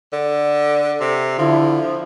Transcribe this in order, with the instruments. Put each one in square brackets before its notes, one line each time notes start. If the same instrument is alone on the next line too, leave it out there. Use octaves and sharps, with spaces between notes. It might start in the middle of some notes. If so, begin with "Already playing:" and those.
[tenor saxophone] D3
C3
[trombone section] D3 E4 [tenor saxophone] F3